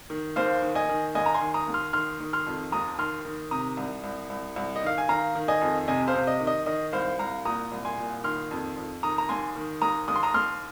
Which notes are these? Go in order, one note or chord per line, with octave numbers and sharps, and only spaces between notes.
D#3
D#2 C5 F5
D#3
D#5 G#5
D#3
D#2 D#5 G#5
A#5
G#5 C6
D#3
A#5 D#6
D#2
C6 F6
D#3 C6 F6
D#3
C6 F6
F2
D#2 A#5 D#6
D#3 C6 F6
D#3
C3 A#5 D#6
C2
C2
C2
C2
D#5
D#3 F5
G#5
D#3 F5 A#5
D#3
D#5 G#5
F2
C3 D#5 G#5
C5 F5
C3
D#5
D#3
D#5
D#3 D#5
C2 C5 F5
C2 F5 A#5
A#2 A#5 D#6
C2
G#5 C6
A#2
D#3 C6 F6
F2
F2
D#3 A#5 D#6
A#5
D#2 G#5 C6
D#3
D#2 A#5 D#6
D#2 D#6
C6
A#5 D#6
D#2 C6 F6